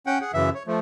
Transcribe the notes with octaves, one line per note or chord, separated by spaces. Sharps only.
C#4 F#5 G5
G#4 F#5
F#2 C#3 E3 E5
C#5
F3 A3